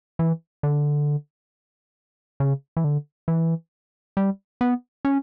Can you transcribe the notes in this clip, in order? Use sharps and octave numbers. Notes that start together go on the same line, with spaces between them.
E3
D3
C#3
E3
D3
E3
G3
B3
C#4